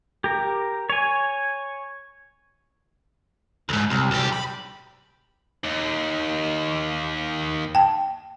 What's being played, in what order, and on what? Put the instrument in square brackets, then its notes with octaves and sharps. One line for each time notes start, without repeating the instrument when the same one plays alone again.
[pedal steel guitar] G4 A#4
C#5 G#5
[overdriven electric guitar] D2 G#2
C2
B1 G4
B5
[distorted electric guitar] D#2
[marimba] G5 A5